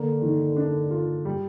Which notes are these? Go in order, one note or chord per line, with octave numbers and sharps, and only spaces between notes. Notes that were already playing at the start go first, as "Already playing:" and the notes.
Already playing: D3 A#3
D#3
D4
F4
G3